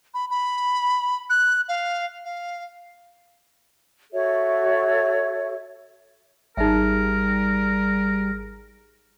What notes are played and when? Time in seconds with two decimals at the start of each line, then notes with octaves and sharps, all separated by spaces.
0.14 B5
0.30 B5
1.30 F#6
1.69 F5
2.25 F5
4.12 F#4 A4 C#5 E5
6.57 G#1 G3 D#4 G#4 A#4 E5